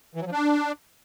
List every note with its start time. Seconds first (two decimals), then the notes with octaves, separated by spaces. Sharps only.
0.15 E3
0.21 F#3
0.26 F3
0.32 D4